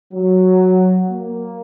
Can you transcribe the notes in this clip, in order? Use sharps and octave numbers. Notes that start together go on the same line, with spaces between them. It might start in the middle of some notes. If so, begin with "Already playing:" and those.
F#3
A#3